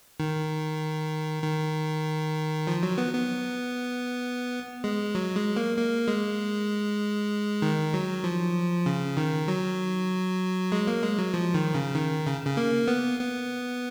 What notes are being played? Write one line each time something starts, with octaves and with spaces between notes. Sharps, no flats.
D#3
D#3
F3
F#3
B3
B3
G#3
F#3
G#3
A#3
A#3
G#3
D#3
F#3
F3
C#3
D#3
F#3
G#3
A#3
G#3
F#3
F3
D#3
C#3
D#3
C#3
C#3
A#3
B3
B3